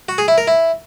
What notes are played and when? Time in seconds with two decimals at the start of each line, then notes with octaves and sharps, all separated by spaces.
0.09 F#4
0.18 G#4
0.28 E4
0.38 A#4
0.47 E4